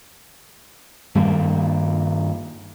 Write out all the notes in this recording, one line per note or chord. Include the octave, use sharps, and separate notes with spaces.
G2 D#3 G3 A#3